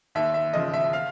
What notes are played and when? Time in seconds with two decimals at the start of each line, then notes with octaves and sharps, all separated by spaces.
0.15 D#2 E5
0.34 E5
0.54 C#3 F3 D#5
0.74 E5
0.93 F5